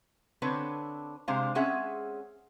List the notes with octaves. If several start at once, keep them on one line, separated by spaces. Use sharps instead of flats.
D3 C4 D4 B4 C#5
C3 G#3 D4 C5 F5
G#3 C4 C#4 G#4 E5 F#5